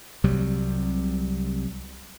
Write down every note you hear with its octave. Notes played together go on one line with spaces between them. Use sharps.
C2 C3 F#3 G3